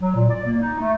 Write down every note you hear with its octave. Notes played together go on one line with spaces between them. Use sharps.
F#3
A#2
D5
A#3
D#4
A3